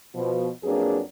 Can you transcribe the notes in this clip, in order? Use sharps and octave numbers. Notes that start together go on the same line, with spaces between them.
B2 F3
F2 F#3 A#3 D4 G#4 B4